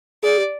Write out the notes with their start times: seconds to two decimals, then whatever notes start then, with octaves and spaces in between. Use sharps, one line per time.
0.23 G#4 D5
0.38 G4